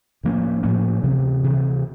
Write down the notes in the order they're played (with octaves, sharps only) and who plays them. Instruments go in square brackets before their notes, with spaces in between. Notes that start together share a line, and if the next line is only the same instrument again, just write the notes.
[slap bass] A2 F3 A#3 C#4
A2 F3 A#3 C#4
D2 C3 E3
D2 C3 E3